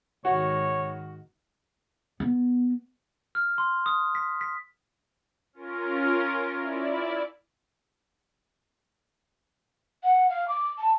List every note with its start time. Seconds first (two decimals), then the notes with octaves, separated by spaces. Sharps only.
0.25 G#1 D#3 F#4 C#5
2.20 B3
3.35 F6
3.58 C6
3.86 D#6
4.15 B6
4.41 B6
5.53 C#4 F4 A#4
6.57 E4 D5
10.04 F#5
10.30 F5
10.48 D6
10.78 A5